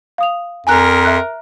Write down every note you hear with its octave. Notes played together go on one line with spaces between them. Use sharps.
F5 D#6 F7
F2 A#4 G#5 A#5 F#6
E5 F#6